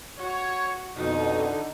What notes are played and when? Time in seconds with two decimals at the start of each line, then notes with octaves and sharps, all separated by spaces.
0.18 F#4 C#5
0.96 F2 B2 D3 D#4